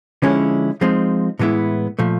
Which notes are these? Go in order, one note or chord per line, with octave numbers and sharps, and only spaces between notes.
D3 F3 G#3 C#4 E4
F3 G#3 C4 D#4
A2 E3 G#3 B3 E4
A#2 F3 A3